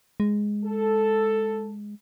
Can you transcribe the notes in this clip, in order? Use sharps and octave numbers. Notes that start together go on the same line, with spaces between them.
G#3
A4